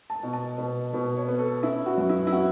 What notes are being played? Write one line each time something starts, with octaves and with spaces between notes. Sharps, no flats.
A5
B2
A5
B2
B2
C#5
B3
A4
C#4 E4
F#4
F#2
E4
E4
C#4 F#4